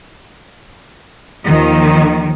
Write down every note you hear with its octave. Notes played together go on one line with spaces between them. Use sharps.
D#2 D#3 F3